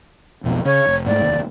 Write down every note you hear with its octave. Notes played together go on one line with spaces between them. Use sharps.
B1 F2 B2
C#3 C#5
F1
G#2 G3 A3 D5
F1 D#2